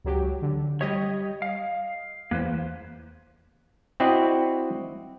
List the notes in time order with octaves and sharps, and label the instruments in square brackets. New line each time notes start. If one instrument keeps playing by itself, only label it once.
[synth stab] C#2 F#3 G4
D3
[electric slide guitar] G3 G4 C#5 [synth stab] D#5
[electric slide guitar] F5
[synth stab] E2 [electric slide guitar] A#3 B4 C5
[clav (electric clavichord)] C4 E4 F#4 D5 D#5 F#5